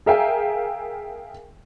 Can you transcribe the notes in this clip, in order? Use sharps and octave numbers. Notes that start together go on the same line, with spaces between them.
G#4 A#4 E5 F5 G5 G#5